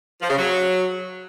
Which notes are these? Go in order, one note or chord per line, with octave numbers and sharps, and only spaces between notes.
F3
C#3
F#3